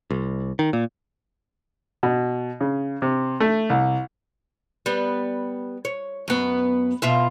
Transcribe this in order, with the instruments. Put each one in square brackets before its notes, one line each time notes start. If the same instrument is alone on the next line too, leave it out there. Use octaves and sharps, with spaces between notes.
[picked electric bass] C2
D#3
A#2
[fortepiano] B2
C#3
C3
A3
C2
[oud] G3 B3
C#5
F#2 B3
B2 F4 E5